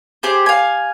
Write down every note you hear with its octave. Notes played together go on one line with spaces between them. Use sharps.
G4 G#4 C5
F5 G#5